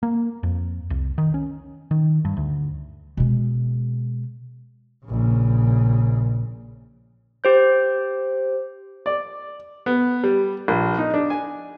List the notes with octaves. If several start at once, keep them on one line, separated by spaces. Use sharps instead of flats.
A#3
F2
C2
D#3
C#4
D#3
G2
D2
B2 G#3
A#1 C#3
G4 C5 G6
D5
B3
G3
A#1
D#4
D4
G#5